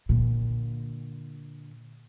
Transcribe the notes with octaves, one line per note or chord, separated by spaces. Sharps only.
A#2 D3